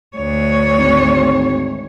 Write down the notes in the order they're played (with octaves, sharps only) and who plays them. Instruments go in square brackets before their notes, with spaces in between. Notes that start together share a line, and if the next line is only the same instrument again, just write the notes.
[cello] D2 C#5
[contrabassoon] G#1